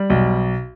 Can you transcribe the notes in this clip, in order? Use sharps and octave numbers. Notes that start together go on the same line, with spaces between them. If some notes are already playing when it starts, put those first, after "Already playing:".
Already playing: G3
B1